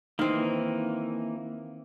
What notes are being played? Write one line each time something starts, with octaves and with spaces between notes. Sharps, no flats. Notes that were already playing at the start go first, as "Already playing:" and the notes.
D#3 E3 A#3 C4